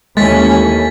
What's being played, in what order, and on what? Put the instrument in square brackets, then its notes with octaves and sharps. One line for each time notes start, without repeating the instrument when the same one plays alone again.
[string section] D#2 E3 C#4 [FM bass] G#3 [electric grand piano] A3 [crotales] A6 B6